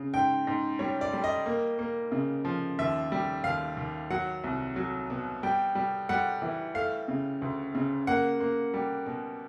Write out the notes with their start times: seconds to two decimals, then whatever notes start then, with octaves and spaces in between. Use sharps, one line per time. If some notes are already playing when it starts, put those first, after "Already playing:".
Already playing: C#3
0.14 G#2 G5
0.47 G#2
0.79 G3 C#5
1.01 D5
1.13 G3
1.24 D#5
1.46 A#3
1.79 A#3
2.12 C#3
2.45 F3
2.79 D#2 E5
3.12 G3
3.44 D#2 F5
3.77 D#2
4.11 F#3 F#5
4.44 C2
4.76 F#3
5.10 B2
5.43 G3 G5
5.75 G3
6.09 G3 F#5
6.42 E3
6.74 A3 F5
7.08 C#3
7.42 D2
7.75 C#3
8.07 A#3 F#5
8.41 A#3
8.74 G3
9.06 B2